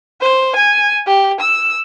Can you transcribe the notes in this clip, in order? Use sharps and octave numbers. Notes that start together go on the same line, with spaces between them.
C5
G#5
G4
E6